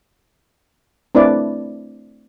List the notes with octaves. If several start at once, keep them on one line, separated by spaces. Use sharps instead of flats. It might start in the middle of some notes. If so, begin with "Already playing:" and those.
A3 C4 D4 E4 B4 D5